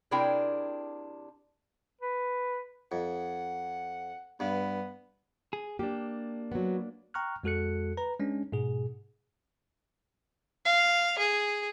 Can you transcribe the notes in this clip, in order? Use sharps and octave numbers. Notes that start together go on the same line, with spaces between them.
C3 D4 E4 G#4 A#4 G5
B4
F2 F#5
G2 B3
G#4
A#3 D4 G4
F#3 B3
G5 A#5 C#6 F6 F#6
F2 G#3 F#4 A4 F#6 C#7
B4 A#5
G#3 C#4 D4
G#2 B2 G#4
F5
G#4